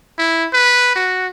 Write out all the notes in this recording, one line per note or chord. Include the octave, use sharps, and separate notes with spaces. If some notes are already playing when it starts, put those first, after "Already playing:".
E4
B4
F#4